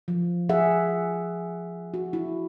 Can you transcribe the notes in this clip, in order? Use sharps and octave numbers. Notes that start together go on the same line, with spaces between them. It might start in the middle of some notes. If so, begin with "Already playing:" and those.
F3
G#4 E5 F#5
F#4
E4